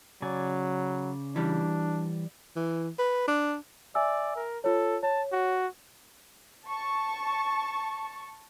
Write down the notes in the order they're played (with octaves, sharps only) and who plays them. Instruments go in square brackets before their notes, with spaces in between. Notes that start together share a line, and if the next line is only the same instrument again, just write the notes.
[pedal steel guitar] C#3 D5 G#5 [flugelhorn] F#3
[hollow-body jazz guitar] E3 G3 [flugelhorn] D4
[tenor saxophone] E3
B4
D4
[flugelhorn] D5 [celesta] E5 G#5 E6
[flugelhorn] A#4
[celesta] F4 C#5 [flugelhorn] A4
[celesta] C#5 [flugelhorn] A5
[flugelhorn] F#4
[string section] A5 C#6